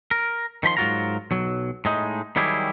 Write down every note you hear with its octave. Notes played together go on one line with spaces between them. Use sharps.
A#4
D#3 F3 B5 C6
G#2 F#3 F4 F#4 A#4 A#5
B1 F#3
A2 G#3 D#4
D#3 F#3 G3 E4 G4 G#4